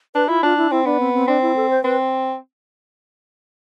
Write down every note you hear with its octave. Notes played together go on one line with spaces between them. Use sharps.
D4 B4
E4 F4
D4 F4
E4
C4 E4
B3 D4
C4
C4
C4 D4
E4
A4
C5
C4 B4